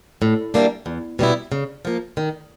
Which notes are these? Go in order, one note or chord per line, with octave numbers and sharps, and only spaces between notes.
A2
E3 G3 A#3 D4
E2
B2 G3 B3 E4
C#3
F3 A#3
D#3